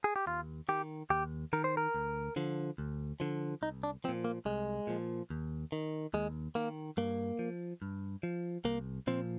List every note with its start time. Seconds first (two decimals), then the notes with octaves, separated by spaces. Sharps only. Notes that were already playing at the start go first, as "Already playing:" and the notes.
0.04 G#4
0.16 G4
0.27 D#2 F4
0.69 D#3 G4
1.10 D#2 G4
1.53 D#3 A#4
1.64 C5
1.77 A#4
1.95 D2
2.36 D3 F3
2.78 D2
3.20 D3 F3
3.62 C2 D#4
3.83 D4
4.04 F3 C4
4.09 A#2
4.24 A#3
4.45 C2 G#3
4.87 A#2 F3
5.30 D#2
5.72 D#3
6.14 D#2 G#3
6.55 D#3 A#3
6.97 G2 A#3
7.39 F3
7.82 G2
8.23 F3
8.65 C2 A#3
9.07 A#2 F3 C4